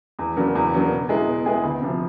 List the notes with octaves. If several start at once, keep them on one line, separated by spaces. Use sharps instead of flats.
E2
C#3 F#3 A#3 D4
E2
C#3 F#3 A#3 D4
B2
G#3 B3 E4 G#4
B2
G#3 B3 E4 G#4
D2
C3 F3